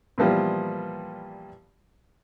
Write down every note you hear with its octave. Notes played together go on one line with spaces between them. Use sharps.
A#2 E3 F3 G3 B3